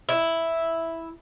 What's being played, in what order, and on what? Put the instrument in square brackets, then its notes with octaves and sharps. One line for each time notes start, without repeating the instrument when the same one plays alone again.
[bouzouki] E4